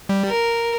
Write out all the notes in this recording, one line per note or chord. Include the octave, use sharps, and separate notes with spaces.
G3
A#4